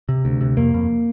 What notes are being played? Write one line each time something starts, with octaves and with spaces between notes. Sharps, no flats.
C3
D2
C3
F2 A#3
F2